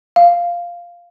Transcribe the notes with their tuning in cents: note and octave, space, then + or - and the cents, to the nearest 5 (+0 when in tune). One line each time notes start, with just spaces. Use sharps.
F5 -5